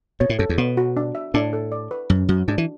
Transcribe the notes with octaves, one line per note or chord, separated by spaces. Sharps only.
B2 C#5
A2
F#2 A4
E2
B2 B3
F#4
D4
E5
A2 D4
A4
D5
B4
F#2 C#4
F#2 F#4
G#2 D4
E3